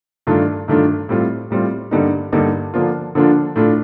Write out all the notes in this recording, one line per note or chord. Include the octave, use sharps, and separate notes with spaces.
G2 D#3 A3 D4 F4
G2 D#3 A3 D4 F4
A2 G3 C4 F4
A2 G3 C4 F4
G2 D3 G3 A#3 D#4
G2 D3 G3 A#3 D#4
D3 F3 A#3 D4 F4
D3 F3 A#3 D4 F4
A2 A3 D4 F4